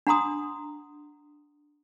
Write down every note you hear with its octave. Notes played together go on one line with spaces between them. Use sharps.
D4 F#5 A#5 C6 D#6